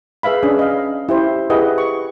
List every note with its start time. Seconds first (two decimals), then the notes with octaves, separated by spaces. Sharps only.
0.23 G#4 B4 E5 F5 B5
0.43 C#4 D4 G#4
0.59 D#5 F5
1.09 E4 G4 C5
1.50 E4 G4 G#4 B4 D#5 F#5
1.78 C#6